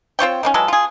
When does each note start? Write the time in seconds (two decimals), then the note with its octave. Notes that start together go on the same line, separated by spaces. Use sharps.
0.19 C4 F4 C#5 G5
0.43 D#3 A#3 C#4
0.54 E3 F#3 G#3 A4
0.68 F4 G#4